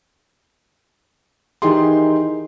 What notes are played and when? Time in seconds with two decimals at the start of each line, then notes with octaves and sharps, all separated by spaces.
1.62 D#3 E3 D#4 G4 G#4 C6